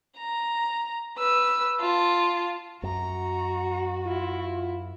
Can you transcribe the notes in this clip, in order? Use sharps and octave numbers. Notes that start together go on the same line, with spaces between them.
A#5
B4 E6
F4 A5
F#2 F#4 A#5
E4 F4